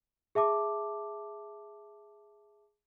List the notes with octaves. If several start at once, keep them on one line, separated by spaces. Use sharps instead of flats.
G#4 E5 A5 D6